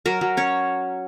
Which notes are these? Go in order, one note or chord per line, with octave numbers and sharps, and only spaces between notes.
F#3 A#4
F#3
C#4 C#5